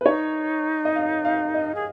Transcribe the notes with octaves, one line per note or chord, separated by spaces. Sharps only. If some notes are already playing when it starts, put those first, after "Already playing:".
B4
D#4 C#5
D#5
F5
F5
D#5
G#4